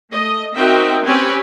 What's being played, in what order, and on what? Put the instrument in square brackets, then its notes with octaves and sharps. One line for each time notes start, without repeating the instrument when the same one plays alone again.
[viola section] A3 D#5
C4 D#4 F#4 A#4 E5 G5
C4 C#4 G4 B4 C#5 G#5